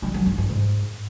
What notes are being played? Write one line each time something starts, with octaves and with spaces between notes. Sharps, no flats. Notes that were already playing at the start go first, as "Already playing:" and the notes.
G3
F#3
G2
G2
G#2